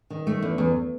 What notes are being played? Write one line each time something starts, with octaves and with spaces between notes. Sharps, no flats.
D#3
A3
E2
E2